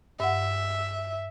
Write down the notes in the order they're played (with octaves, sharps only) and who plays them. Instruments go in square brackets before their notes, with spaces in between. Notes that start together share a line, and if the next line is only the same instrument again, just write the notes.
[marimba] G2 F#5 [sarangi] E5